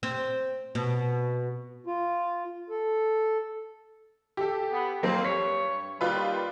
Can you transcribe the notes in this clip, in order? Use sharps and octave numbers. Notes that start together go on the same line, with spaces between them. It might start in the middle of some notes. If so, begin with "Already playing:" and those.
C4
B2
F4
A4
G4 A4
B3
F2 F#3 A#3 C4 C5
G2 C#5 B6
D#2 G3 F4 B4